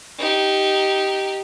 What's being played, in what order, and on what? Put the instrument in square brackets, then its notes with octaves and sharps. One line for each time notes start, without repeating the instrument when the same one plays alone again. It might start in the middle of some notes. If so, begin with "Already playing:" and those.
[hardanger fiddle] D#4 G4